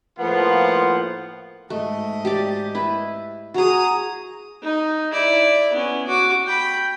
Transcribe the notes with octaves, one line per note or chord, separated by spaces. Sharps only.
A2 F3 A#3 B3 F4 F#5
G#2 A3 D#5
G4 D5
E4 B4
F#4 G#4 A#5 D#6
D#4
E4 D5
B3 C#4
F#4 D6
G5 B5